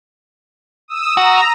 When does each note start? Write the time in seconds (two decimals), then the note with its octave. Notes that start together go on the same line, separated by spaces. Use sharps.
0.88 D#6 E6
1.17 F#4 A#5